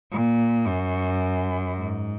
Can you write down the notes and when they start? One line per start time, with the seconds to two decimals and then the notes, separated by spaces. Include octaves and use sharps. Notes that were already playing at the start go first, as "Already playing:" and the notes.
0.12 A#2
0.67 F#2
1.76 G#2